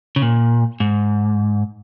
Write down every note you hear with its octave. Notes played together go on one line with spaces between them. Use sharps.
C#3
A#2
G#2